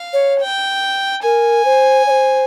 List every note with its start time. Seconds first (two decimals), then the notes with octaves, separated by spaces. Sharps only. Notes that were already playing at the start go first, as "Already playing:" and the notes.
Already playing: F5
0.13 C#5
0.40 G5
1.23 A#4 G#5
1.65 C5
2.07 C#5
2.10 C5